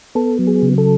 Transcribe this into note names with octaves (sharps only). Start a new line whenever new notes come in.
B3 A4
F#3
G#4
C#3
A4